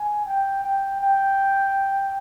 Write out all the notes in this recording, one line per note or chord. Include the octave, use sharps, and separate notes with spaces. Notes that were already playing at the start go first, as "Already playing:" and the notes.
Already playing: G#5
G5
G5
G5